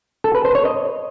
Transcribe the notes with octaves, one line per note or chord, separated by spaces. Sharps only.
A4
B4
C5
C#5
D#5